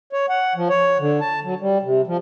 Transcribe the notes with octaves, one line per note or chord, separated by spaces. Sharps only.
C#5
F#5
F3
C#5
D3
A5
F#3
G3
C3
F3